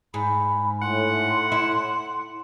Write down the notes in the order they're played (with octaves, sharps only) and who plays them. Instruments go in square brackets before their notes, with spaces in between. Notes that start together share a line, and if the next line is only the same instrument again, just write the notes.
[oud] G#2 [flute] B5
[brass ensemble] A2 [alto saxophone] F#5 [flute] C6
[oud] E4